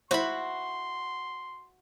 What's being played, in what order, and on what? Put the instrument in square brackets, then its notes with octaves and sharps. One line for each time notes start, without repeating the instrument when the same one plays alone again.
[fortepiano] E4 C5 [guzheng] F#4 B5 [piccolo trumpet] C6